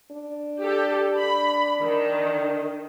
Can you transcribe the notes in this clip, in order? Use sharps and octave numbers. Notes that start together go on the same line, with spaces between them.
D4
G4 A4
B5
D#3